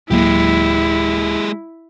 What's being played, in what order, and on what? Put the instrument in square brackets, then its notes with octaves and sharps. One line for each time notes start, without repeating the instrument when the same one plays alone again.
[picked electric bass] D1 F#3 A#3 [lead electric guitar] G#3 G4 [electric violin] E4